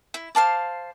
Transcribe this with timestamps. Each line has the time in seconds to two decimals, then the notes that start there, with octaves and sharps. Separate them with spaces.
0.14 E4
0.35 C5 F5 A5 D6